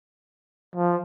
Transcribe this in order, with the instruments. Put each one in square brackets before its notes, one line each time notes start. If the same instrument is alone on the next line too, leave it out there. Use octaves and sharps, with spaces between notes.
[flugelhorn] F3